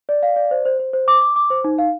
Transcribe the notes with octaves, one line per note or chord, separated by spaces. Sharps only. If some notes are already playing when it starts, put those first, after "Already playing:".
D5
F5
D5
C5
C5
C5
C5
D6
D6
D6
C5
D#4
F5